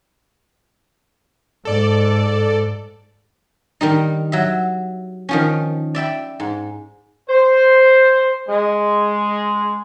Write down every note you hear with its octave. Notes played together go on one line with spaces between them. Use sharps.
G#2 A4 D5
D#3 G3 D#4
F#3 E5
D#3 F3 C#4
D5 E5 G5 B5
G#2
C5
G#3